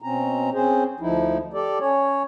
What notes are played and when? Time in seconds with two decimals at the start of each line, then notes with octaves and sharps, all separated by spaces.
0.02 B2 C4 C#4 A#5
0.53 C4 C#4 G#4 C5
1.00 D2 F3 D#4 E4
1.54 G4 A4 D5
1.80 C#4 C#5